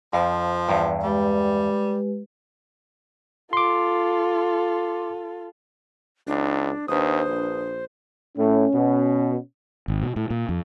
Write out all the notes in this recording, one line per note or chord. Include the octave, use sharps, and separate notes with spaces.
F2 F3
E2 G2
G3 G#3 G4 B4
F4 A4 C6 D6
C#2 D4
D#2 D4 B4 C5 D#6
A#1
A2 C#4
B2
G#1
B2
A2
A#2
F2